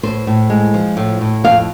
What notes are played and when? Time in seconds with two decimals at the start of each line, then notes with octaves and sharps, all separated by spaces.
0.03 A2 C5
0.27 A2
0.50 G#3
0.74 F3
0.97 A2
1.21 A2
1.44 F2 F5